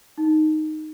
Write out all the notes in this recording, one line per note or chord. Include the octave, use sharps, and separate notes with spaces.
D#4